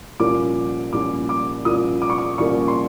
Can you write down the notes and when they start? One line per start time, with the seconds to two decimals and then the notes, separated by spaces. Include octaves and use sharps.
0.19 C2 A#2 F3 A#3 C#4 D6
0.93 C2 A#2 F3 A#3 C#4 D6
1.29 D6
1.65 C2 A#2 F3 A#3 C#4 D#6
2.02 D6
2.10 C#6
2.18 D6
2.38 C2 A#2 F3 A#3 C#4 C#6
2.68 C6